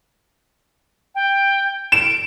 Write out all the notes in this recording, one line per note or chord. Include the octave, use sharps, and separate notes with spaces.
G5
D7 E7